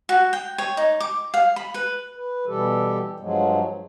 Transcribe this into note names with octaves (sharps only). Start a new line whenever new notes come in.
F#4
G5
C#5
D#4
D6
F5
B5
B4
B4
B2 E3 G3 G4 A4
G2 F3 F#3 G#3